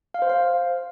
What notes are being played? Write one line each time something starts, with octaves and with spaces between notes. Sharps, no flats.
F5
C5
F5